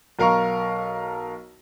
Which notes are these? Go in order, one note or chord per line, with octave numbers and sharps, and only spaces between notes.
B1 A#4 F5 A#5 C#6